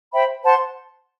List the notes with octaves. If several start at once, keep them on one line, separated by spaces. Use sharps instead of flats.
C5 E5 G5 B5
C5 F#5 A5 C6